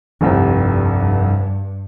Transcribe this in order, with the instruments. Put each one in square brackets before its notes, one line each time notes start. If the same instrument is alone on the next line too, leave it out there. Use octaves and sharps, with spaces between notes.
[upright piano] F1 C2 C4 [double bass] G2